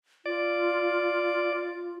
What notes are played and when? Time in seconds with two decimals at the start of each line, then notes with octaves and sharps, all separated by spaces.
0.26 F4 D5